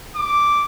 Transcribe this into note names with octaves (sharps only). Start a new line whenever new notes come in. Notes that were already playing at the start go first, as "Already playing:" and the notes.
D6